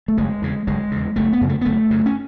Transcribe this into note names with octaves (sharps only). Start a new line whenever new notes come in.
A3
F#1 G#3
E2 C#3
F#1 G#3
E2 C#3
F#1 A3
B3
F#2 C#3
A3
B3
F#1 A3
F#2 C#3
C#4